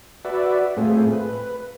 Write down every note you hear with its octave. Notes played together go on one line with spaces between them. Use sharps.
F#4 B4 D5 E5
A2 A3 C4 F4 G#4
B4